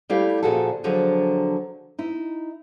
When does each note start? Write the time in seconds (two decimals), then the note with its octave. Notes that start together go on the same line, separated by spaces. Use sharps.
0.09 G3 A3 E4 G4 F5
0.43 A#2 C#3 F3 F#4 G#4 A4
0.84 D3 F3 F#3 G#4
1.99 D#4 E4